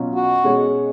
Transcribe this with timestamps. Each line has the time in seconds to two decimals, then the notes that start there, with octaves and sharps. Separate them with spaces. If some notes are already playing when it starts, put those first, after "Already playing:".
Already playing: B2 F#3 C#4 F4
0.15 F#4
0.44 B2 G#3 C#4 G#4 C#5